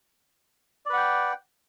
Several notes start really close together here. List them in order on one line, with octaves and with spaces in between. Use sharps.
D5 B4 F#5 G5